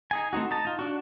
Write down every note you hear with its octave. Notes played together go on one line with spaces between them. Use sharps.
D#4 G#4 G#5
A3 C4 D#4 F#4
D#4 A5
D#4 F4
D4 F#4